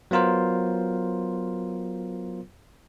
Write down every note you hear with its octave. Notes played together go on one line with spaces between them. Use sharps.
F#3 B3 F4 A#4 C5